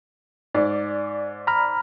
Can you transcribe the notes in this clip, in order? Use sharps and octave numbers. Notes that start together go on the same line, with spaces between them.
G#2 D5
A#5 B5 F6